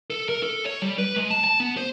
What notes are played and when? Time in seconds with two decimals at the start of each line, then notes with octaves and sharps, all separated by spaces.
0.10 A4
0.29 A#4
0.43 A4
0.65 C#5
0.82 G3
0.98 B4
1.16 G#3
1.30 A5
1.44 A5
1.60 B3
1.77 C5